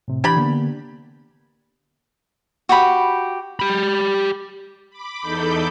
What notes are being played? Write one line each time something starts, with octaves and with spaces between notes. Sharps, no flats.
A2 C3
E3 D4 G4 B5 G#6
D3 A#3 B3
F#4 G4 B5
G4 B5
B5 D6
E2 D#4 A4 B5 D6 G6